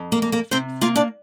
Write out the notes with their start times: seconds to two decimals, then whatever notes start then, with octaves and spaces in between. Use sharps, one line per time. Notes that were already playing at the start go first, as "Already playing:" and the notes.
Already playing: F2
0.12 A#3 A#4
0.22 A#3
0.32 A#3 A#4
0.51 C3 C4 C5
0.81 A#3 F4 F5
0.96 D4 D5